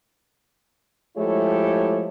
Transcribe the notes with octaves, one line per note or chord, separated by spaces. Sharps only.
F3 G#3 A3 E4 G4 C#5